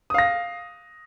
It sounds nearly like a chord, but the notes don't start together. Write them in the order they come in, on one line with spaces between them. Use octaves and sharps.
D#6 F5 A#6